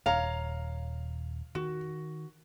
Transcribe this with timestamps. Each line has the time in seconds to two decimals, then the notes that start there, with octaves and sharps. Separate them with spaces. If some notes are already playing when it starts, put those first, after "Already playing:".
0.06 D#1 C#5 F5 A#5
1.55 D#3 F#4